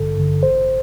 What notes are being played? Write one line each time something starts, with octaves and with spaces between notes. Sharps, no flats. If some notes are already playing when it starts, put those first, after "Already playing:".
Already playing: A1 G2 D3 A4
G2 D3
A1 C5